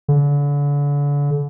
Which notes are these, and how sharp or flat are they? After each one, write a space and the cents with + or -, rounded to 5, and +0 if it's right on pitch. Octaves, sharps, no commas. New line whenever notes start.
D3 -35